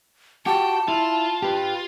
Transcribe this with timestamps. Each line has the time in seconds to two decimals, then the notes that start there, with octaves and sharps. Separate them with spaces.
0.46 F#4 G4 G5 A5
0.88 E4 F4
1.42 G4 B4